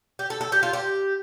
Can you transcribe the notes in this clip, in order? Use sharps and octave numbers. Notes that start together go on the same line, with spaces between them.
G4
A4
A4
G4
F4
G4